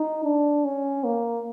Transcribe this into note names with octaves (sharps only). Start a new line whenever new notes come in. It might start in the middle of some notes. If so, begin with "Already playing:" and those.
Already playing: D#4
D4
C#4
A#3